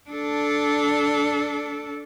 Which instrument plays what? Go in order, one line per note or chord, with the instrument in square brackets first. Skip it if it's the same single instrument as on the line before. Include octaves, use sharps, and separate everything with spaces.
[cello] D4 A4